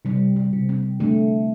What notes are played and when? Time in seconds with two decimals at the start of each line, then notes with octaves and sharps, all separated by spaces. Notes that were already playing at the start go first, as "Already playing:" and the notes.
0.05 C3 G3
0.36 G3
0.53 C3
0.69 C4
1.00 D3 A3